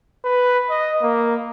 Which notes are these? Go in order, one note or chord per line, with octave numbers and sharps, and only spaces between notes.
B4
D#5
A#3